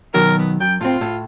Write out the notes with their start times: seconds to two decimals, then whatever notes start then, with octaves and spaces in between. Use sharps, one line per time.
0.14 B2 D#3 F#3 A#4
0.39 B3
0.60 F#2 G5
0.81 A2 C4 F4
1.01 A2